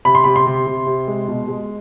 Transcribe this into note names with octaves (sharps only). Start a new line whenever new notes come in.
C3 B5
C6
C3 B5
C6
C3
C3
C3
G#3
B2
G#3